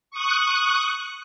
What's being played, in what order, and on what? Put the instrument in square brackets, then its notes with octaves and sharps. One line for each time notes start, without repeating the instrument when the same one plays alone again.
[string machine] C#6 D#6 F#6